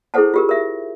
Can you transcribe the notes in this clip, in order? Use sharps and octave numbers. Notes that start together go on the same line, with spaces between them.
E4 G#4 A4 C5 F#5 A5
F4 G4 A#4
A#4 E5